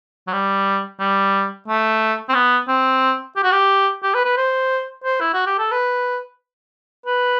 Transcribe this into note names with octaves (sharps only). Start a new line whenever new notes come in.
F#3
G3
G3
A3
C4
B3
C4
G4
F#4
G4
G4
B4
B4
C5
C5
E4
F#4
G4
A4
B4
B4